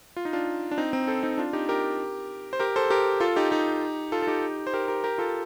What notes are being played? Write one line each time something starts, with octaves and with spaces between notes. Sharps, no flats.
F4
D#4
D4 F4
D4
C4 D#4
C4 D#4
A4 C5
C4 D#4
D4 F4
D#4 G4
G4 A#4
C5
G4 A#4
A4 C5
G4 A#4
F4 A4
D#4 G4
D#4 G4
F4 A4
A4
D#4 G4
C5
G4 A#4
G4 A#4
G4 A#4
F4 A4